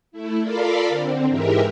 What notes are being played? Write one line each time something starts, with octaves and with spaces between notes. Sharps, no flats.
A3 E4
F4 A4 A#4 D5 F5 B5
D3 C4
G#2 E3 G#3 G4 A#4 E5